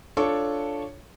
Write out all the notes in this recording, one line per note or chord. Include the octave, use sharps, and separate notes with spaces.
D4 F4 A4 C#5 C#6 D6